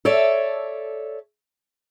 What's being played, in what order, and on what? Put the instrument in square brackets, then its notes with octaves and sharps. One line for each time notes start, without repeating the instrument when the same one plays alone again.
[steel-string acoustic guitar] A4 C#5 D5 E5